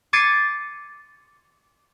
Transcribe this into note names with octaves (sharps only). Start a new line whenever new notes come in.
D6 G#6 A6 C7 C#7 D#7